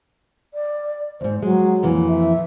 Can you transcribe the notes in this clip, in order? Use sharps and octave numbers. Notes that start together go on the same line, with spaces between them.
D5
E2 G#2 C5
F#3 G#3
F2 A#2 E3
E5